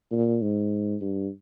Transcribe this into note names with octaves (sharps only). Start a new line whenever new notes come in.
A#2
G#2
G2